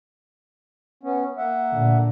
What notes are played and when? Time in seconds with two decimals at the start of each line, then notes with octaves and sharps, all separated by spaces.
1.03 B3 C#4
1.37 A#3 E5 F#5
1.70 A#2 D3